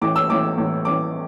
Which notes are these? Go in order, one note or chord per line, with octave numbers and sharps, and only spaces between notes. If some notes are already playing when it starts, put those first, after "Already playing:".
A1 A2 E3 D6
E6
A1 A2 E3 D6
A1 A2 E3
A1 A2 E3 D6